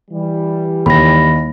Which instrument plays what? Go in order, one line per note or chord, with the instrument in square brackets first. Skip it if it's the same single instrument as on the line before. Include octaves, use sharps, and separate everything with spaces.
[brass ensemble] E3 G3
[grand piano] D#2 [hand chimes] B5 A#6